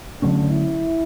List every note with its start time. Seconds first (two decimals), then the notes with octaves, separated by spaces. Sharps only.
0.22 D3 F#3 A3 C#4 D4
0.51 E4